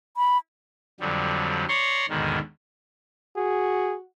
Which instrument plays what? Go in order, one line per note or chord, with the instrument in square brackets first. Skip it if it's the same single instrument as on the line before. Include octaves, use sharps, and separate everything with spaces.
[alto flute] B5
[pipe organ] F2 D3 F#3 G3
C#5 D5 A#5 C6 C#6
D#2 G#2 B2 D3 D#3
[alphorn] F#4 [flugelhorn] G#4